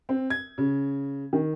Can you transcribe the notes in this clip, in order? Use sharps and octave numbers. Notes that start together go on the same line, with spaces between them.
C4
G#6
C#3
D#3